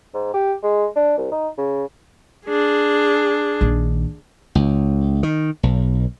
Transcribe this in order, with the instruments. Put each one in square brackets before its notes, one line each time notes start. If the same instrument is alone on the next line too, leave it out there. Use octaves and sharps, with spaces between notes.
[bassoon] G#2
G4
G#3
D4
C2
D#4
C#3
[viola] D4 G#4
[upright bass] A#1 D#3
[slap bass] C#2
D#3
B1